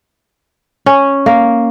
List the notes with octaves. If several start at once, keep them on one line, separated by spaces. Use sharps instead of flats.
C#4
A#3